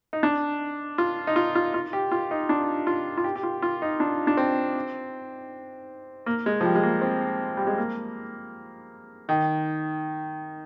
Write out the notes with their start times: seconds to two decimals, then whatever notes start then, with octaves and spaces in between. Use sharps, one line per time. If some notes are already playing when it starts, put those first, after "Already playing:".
0.13 D#4
0.23 D4
0.98 F4
1.27 D#4
1.36 F4
1.55 F4
1.74 F4
1.93 G4
2.11 F4
2.31 D#4
2.49 D4
2.87 F4
3.17 F4
3.24 G4
3.36 G4
3.43 F4
3.62 F4
3.82 D#4
4.00 D4
4.27 D4
4.37 C4
6.26 A#3
6.46 G#3
6.61 F3
6.64 G3
6.75 G#3
6.83 A#3
7.02 C4
7.57 G3
7.67 G#3
7.78 A#3
9.29 D#3